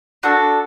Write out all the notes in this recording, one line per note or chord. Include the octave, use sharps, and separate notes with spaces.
D4 F#4 A4